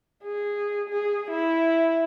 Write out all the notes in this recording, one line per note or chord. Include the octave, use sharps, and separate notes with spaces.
G#4
G#4
E4